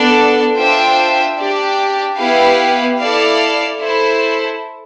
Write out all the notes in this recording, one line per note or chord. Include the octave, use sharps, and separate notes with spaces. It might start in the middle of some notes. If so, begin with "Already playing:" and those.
Already playing: B3 D4 A4 D5
D4 F4 C5 E5 G5
D4 G4 D5
B3 E4 G4 B4 F5
E4 A4 D5 F5
E4 A4 C5